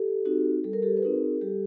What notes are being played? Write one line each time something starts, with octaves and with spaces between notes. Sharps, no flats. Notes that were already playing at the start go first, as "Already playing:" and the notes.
Already playing: G4 A4
C4 D#4 F#4
G3 A4
A#4
G4 A4
B4
C4 D#4 F#4 G#4 A#4
G3 G4 A4